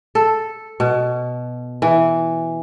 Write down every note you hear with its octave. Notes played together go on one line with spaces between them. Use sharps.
A4
B2
E3